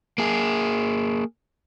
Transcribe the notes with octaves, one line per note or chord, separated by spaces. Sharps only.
A#3 G#4